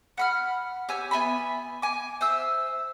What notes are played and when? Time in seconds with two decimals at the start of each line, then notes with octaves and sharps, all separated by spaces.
0.17 F#5 B5 F6
0.89 G4 C#5 G#5 E6
1.11 B3 E5 G#5 B5
1.82 G#5 D6
2.21 C5 E5 E6